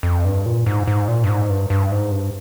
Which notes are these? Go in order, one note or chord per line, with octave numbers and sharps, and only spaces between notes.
F2
G2
A#2
G#2
G#2
A#2
G2
G#2
G2
G2
G#2
G2